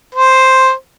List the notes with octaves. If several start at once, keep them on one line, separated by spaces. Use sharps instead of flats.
C5